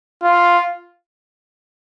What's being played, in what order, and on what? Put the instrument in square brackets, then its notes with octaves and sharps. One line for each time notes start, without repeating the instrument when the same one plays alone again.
[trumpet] F4